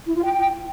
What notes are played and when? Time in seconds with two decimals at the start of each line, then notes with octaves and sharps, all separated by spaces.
0.06 E4
0.15 F4
0.23 G5